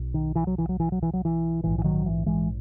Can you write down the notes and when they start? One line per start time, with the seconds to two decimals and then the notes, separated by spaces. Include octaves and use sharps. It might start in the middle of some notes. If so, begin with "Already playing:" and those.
Already playing: B1
0.14 D#3
0.35 E3
0.47 F#3
0.58 E3
0.69 F#3
0.80 E3
0.92 F#3
1.03 E3
1.13 F#3
1.25 E3
1.63 A#1 G#2 E3
1.79 E3
1.84 D#3 F#3
2.06 E3
2.26 E3 G#3